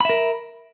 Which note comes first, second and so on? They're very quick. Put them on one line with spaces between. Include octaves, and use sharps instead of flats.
B5 E5 A#4